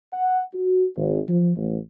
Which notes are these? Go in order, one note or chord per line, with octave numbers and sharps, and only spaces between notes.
F#5
F#4
G#1
F3
A1